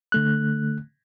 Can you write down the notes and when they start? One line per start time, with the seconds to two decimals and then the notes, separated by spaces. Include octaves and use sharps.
0.12 D3 A3 F#6